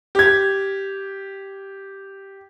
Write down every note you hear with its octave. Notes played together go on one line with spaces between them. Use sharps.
G4 G#6